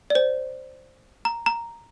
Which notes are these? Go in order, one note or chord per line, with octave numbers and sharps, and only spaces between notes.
D5
C5
A#5
A#5